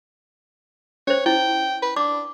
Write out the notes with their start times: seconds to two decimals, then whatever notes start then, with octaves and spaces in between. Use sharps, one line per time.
1.07 C#4 C5 C#5
1.26 E4 G5
1.82 B4
1.97 D4 D6